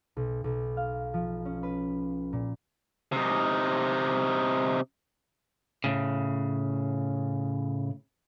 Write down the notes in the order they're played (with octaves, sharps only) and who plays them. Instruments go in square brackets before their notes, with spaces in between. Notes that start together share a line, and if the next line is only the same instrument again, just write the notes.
[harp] B1
B1
F5
F3
C#4
B4
A#2
[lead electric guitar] C3 D#4
A2 C#3